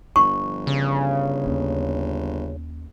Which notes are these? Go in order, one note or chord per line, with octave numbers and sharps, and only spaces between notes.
G1 F3 D4 C#6
C#3
D#2 C#4